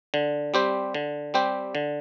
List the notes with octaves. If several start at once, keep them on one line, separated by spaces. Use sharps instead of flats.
D3
G3 C4 G4 C5
D3
G3 C4 G4 C5
D3